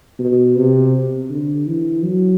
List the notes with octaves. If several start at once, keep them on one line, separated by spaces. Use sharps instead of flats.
B2
C3
D3
E3
F#3